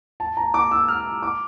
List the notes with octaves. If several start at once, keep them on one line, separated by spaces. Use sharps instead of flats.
A5
A#5
D6
E6
F6
D6